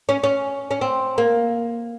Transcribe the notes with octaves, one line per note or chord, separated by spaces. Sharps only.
C#4
C#4
C#4
C4
A#3